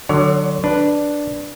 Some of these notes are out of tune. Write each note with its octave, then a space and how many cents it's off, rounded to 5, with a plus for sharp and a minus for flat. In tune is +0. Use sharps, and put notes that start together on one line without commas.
D3 +25 F#3 +0 C#5 +35
D4 +0 B4 +0